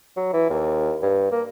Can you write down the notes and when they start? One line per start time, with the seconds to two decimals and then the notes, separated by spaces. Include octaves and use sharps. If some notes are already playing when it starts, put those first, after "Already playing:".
0.17 F#3
0.33 E3
0.50 D#2
1.02 G2
1.32 A#3